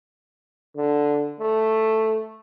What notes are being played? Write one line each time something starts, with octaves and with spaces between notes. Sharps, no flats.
D3
A3